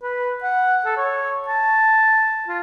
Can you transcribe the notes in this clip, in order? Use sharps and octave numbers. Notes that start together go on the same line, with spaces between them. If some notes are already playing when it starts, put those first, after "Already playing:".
B4
F#5
A4
C#5
A5
F4